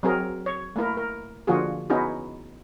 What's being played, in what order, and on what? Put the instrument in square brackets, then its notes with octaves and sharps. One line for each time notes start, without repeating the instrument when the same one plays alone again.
[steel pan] F#3 C4 G#4 A#4
C#5
A3 A#3 E4 A#4
A#4
D3 F3 A#3 F4 F#4 G#4
B3 C#4 D#4 E4 F#4 G#4